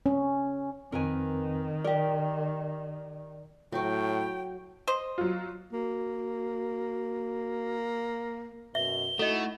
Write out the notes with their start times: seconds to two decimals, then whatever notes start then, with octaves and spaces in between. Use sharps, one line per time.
0.06 C#4
0.92 F2 D#3 C4 A#4 B4 G#5
1.84 G4 A#4 D5
3.72 A2 F#3 F#4 G5
4.88 C5 D#5
5.18 F#3 F4
5.73 A#3 F#4
8.75 F#2 B2 E5 G7
9.19 A3 D#4 E4 F#4 A4 D#5